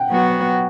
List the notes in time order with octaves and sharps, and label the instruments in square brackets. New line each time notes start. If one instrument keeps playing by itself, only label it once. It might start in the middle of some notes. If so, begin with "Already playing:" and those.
Already playing: [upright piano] F#5 G5
[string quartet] F#3 B3 F#4